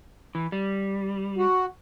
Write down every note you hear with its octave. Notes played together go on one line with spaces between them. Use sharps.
E3
G3
F#4